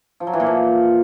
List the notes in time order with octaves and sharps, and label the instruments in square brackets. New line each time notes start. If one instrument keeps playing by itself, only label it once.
[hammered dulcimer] F3
F#3
E3
A#2
F3